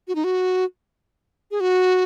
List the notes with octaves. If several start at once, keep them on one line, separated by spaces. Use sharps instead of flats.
F#4
D#4
F#4
G#4
F#4